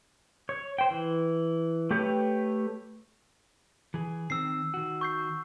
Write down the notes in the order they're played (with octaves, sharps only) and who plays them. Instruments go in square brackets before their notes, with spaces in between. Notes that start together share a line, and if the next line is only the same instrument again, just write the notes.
[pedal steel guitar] C#5
C5 G5
E3
A3 G4 B4 C#5
[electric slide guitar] E3 G#4
[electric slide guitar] D#3 C4 [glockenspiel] E6 C7
[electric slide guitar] D#3 F#4
[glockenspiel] C#6 G6 C7